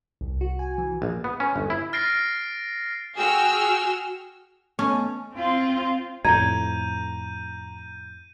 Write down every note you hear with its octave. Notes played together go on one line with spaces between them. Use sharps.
C2
F#4
G#5
E3
A#1
B3
C#4
G1
E4
F6 A6 A#6 C7 D7
F#4 G#4 G5 E6 F6
A3 B3 C#4 A5
C4 F4
F2 A2 A#5 G6 G#6 D#7